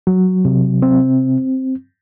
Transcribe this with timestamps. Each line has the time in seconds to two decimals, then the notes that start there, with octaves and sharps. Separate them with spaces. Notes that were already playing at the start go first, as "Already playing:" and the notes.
0.07 F#3
0.45 C3
0.82 C4